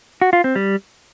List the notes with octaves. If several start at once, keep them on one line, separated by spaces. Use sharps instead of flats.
F#4
F4
C4
G3